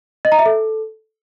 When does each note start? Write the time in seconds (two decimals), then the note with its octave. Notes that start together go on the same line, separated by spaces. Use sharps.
0.25 D#5
0.32 A#5
0.39 E5
0.46 A4